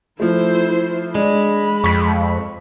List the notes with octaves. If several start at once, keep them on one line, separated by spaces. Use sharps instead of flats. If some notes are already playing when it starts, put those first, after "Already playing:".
F3 A3 E4 C5
G#3 D4 B5
F2 C#6 B6